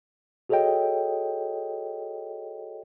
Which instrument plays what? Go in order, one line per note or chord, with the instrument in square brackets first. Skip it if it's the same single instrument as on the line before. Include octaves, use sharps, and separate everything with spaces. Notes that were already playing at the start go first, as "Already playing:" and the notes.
[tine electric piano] F#4 G#4 A4 C#5 D#5 G5